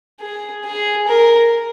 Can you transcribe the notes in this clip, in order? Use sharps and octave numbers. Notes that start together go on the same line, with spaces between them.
G#4
G#4
A#4